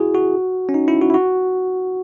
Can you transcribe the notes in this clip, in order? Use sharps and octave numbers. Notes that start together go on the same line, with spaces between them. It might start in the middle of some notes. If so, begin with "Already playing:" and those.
Already playing: E4 F#4 G#4
F#4
C#4
D#4
E4
F#4
E4
F#4